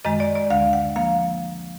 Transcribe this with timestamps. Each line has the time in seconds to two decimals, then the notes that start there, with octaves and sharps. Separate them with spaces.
0.05 F#2 D#3 G#3 D#5
0.20 D5
0.35 D5
0.50 D2 D3 G#3 F5
0.73 F#5
0.96 F3 A#3 F5